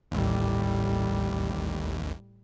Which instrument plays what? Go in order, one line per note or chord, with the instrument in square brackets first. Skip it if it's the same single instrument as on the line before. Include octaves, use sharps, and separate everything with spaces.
[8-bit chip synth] A1 D#2 [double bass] A2 G3